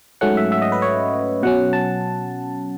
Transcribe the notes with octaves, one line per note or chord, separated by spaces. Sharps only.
G#2 F#3 A3 C#4 F#5
E5
E5
D#5
B4
C#5
B2 F#3 C#4 F#5
A5